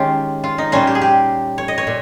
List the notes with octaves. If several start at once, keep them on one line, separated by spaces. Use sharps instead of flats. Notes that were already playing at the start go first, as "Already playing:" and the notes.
Already playing: D#3 G#3 C#4 F4 G4
F4
D#4
A#2 G3 C#4 F4
G4
G#4
G4
C#5
D#5
C#5
A#2